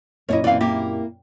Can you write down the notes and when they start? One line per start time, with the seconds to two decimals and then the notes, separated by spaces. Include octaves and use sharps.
0.29 F#2 A#2 A#3 D4 E4 C#5 D#5
0.44 E3 C4 D5 F5
0.61 A#3 E4 G4